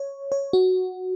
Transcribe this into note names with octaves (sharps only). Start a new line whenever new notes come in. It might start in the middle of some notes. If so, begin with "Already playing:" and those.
Already playing: C#5
C#5
F#4